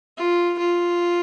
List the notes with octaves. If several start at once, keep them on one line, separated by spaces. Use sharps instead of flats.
F4
F4